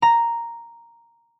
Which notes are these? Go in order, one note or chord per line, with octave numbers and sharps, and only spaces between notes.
A#5